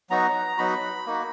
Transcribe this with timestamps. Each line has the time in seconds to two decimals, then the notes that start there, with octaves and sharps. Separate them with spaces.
0.10 F#3 B3 D#4 F#4 A#5
0.58 F#3 B3 D#4 F#4 B5
1.06 A#3 D#4 F#4